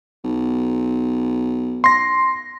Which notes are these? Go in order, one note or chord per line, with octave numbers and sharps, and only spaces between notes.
B1
C6 A#6